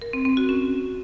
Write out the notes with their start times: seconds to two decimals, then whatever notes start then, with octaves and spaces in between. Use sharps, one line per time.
0.02 A#4
0.13 C4
0.25 C4
0.37 F#4
0.49 C#4